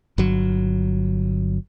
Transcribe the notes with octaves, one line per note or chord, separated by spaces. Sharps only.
G1 F#3